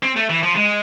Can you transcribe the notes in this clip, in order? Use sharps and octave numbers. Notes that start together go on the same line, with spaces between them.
C4
A3
E3
F3
G#3